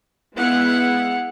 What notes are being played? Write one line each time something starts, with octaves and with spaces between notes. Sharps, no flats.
G#3 B3 E4 F5 F#5